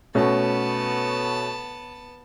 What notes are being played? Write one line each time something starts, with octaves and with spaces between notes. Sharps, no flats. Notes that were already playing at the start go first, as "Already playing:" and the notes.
B2 A3 B3 C#4 A5